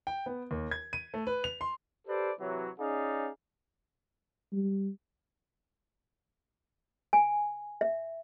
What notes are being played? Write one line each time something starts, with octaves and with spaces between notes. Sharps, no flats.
G5
B3
D#2
G#6
D#7
A3
B4
F7
C6
G4 A4 B4 C5 D5
C3 E3 F#3
C#4 D#4 G#4 D5 F5
G3
G#5
E5